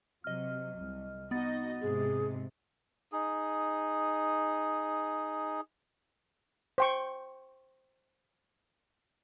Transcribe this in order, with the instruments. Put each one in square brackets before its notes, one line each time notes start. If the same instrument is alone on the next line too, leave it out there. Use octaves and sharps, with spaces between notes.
[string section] C3 F#3 [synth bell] D#5 F6
[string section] C2
[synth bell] B3 A6 [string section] D#4 F#4 D#5
[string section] G#2 C3 G#3 [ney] G#4
[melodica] D#4 G#4
[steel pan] C5 G5 C#6